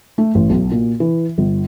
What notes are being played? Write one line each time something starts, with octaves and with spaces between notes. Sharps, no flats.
A3
A1
B1
A#2
E3
G1